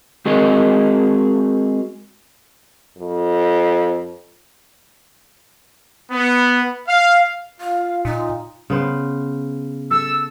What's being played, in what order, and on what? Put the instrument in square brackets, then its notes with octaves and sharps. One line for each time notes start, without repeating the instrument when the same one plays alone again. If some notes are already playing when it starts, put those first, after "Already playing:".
[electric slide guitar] G#3 C4 F#4 G#4 A#4 D#5
[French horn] F2
[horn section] B3
F5
[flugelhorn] F4 [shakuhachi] F5
[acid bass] A#2 [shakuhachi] D#4
[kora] C#3 B3 C5
[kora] A4 [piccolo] E6